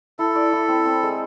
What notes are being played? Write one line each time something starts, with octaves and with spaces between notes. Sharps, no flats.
E4 A4
D5
E4
C4
C4
G#3